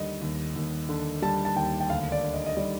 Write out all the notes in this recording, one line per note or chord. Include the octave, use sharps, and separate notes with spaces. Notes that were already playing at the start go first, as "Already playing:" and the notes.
Already playing: D#2 D3 G3 D#5
D#2
D#2
D3
G3 A5
A5
D#2 G5
G5
D2 F5
D5
D3
D#5
D#5
G3 D5